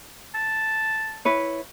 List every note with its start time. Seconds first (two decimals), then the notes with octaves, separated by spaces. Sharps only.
0.35 A5
1.25 E4 B4 C#5